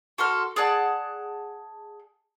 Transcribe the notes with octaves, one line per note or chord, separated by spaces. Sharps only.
F#4 A4 C6 F6
G#4 D5 F#5 A5